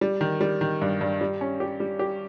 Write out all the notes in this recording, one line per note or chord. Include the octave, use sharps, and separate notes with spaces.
G3
D#3
G3
D#3
G2
G2
G3
C#4
G4
G3
G4